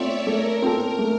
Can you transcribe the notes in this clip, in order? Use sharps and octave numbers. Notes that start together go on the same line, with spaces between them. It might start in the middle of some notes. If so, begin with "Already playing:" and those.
Already playing: A3 C4 F4 A4 C#5 D5 E5
A3 A#4
C4 F4 A4
A3